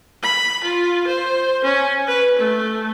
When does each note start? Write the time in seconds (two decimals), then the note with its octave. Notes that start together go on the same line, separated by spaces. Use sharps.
0.23 B5
0.64 F4
1.07 C5
1.64 C#4
2.07 B4
2.38 A3